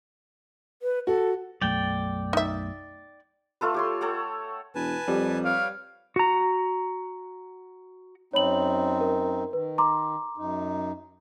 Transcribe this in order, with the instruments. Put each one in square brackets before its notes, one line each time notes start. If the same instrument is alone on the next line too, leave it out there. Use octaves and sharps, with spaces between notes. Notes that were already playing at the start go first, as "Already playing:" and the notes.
[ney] B4
[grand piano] F#4 [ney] A4
[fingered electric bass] B1 F#2 A3 [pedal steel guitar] D5 G5
[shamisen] D#4 E5
[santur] A3 F4 A4 B4
G4 C#5 C6
A4 C#5 F#5 G5
[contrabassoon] E1 [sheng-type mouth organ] B4 G#5 A5
[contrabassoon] F2 [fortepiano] G3
[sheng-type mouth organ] B4 C#5 G5 [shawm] F5
[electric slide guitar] F#4 A#5
[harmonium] F#2 C4 D#4 [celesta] C#5 B5 F#7
[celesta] A#4
[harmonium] D#3 [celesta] B4
[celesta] A#5 C6 D6
[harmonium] F#2 D#4